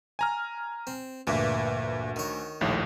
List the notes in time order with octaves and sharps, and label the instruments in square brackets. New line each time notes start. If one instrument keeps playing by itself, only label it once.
[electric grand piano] G#5 A#5 F6
[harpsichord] C4
[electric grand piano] D2 [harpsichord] G2 A#2 E3
[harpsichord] D#3 C#5
[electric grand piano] A#1 D#2 A2